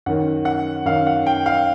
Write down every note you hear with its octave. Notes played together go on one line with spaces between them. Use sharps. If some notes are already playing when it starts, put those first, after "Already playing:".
F#2 D#3 F#5
F#5
F#2 D#3 F5
F#5
G5
F5